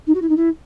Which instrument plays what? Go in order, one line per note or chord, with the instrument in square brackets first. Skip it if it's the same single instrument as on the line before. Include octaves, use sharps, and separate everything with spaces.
[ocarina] D#4
F#4
E4
D#4
E4